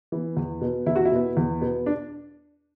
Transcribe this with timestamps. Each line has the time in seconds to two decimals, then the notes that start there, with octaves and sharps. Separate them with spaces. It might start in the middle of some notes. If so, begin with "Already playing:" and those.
0.12 E3 B3
0.37 E2
0.61 B2 B3
0.86 E2 E4
0.96 F#4
1.05 E4
1.12 B2 B3
1.37 E2
1.61 B2 B3
1.86 D4